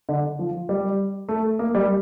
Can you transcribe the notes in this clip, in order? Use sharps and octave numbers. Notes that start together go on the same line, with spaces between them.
D3
F3
G3
A3
A#3
G3